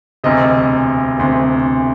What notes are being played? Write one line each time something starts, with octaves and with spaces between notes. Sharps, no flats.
E1 D2 C3 D#5
E1 D2 C3